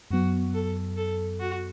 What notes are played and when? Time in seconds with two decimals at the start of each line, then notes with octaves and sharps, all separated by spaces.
0.11 F#2 F#3 B3 F#4
0.54 A4
0.97 A4
1.40 F#4